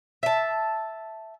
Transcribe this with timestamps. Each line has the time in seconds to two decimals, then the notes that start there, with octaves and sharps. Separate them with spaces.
0.23 E5 A5